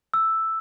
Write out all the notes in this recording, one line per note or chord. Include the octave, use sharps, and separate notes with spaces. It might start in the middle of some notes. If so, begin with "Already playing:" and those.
E6